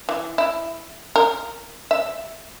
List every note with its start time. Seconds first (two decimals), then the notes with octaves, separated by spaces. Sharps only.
0.09 E3
0.38 E4
1.16 A#4
1.91 E5